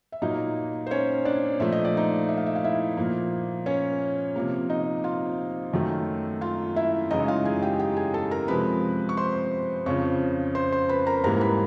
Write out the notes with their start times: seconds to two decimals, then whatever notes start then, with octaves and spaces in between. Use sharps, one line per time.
0.12 E5
0.22 A#2 F#3 A#3 D#4 D#5
0.86 C5
0.91 C#4 C#5
1.25 D4 D5
1.60 A#2 F3 A3 E5
1.72 D#5
1.85 D5
1.97 D#4 D#5
2.29 E5
2.37 F5
2.46 E5
2.56 F5
2.64 E4 E5
2.97 A#2 F3 A#3
3.66 C#4 C#5
4.36 C3 F3 A#3
4.69 D#4 D#5
5.04 F4 F5
5.73 F#2 D#3 F#3 A3
6.41 F4 F5
6.76 E4 E5
7.11 F#2 C#3 E3 G#3 D#4 D#5
7.28 F4 F5
7.45 G#4 G#5
7.62 G4 G5
7.79 G4 G5
7.97 G#4 G#5
8.14 A4 A5
8.31 A#4 A#5
8.48 C3 F3 G#3 B4 B5
9.09 C#6
9.17 C5 C6
9.86 F2 C#3 F3 C#5 C#6
10.55 C5 C6
10.72 C5 C6
10.89 B4 B5
11.07 A#4 A#5
11.24 G#2 E3 G3 A#3 A#4 A#5
11.41 B4 B5